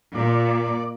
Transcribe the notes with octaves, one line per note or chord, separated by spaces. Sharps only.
A#2 D5